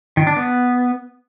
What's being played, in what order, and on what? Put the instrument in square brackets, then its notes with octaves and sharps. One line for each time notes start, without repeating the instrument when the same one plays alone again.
[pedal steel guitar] D#3
D4
B3